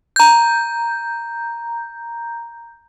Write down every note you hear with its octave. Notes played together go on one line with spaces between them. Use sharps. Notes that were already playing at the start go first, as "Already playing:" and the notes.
A#5 G6